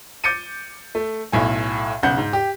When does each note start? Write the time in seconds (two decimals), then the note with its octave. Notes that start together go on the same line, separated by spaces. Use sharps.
0.24 D6 G6 A6 C#7 D#7
0.95 A3
1.32 B1 A2 G#5
2.03 B1 C#3 F#5 G6
2.18 G#2
2.33 G4